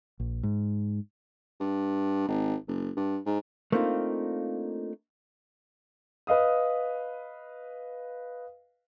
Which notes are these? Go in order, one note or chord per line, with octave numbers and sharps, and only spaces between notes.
A#1
G#2
G2
G#1
F#1
G2
G#2
A3 A#3 C4 D4 D#4 F4
B4 D#5 F5 D#6